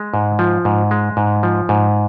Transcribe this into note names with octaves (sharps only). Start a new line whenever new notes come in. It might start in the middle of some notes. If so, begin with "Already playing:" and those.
Already playing: G#3
G#2
F3
G#2
G#3
G#2
F3
G#2